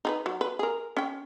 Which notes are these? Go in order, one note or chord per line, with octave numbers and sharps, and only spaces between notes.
D#4 G#4 B4
F#3
B4
G#4 A#4
C#4 G5